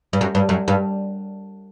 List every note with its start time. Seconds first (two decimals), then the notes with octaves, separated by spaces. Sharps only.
0.13 G2
0.21 F#2
0.35 G2
0.49 F#2
0.68 G2